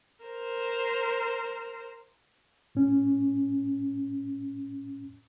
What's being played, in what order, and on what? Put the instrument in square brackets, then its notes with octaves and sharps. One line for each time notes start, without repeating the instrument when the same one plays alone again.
[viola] A#4 C5
[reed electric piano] A2 C#4